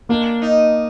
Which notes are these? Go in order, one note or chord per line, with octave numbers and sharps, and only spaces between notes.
A#3 D4
D#4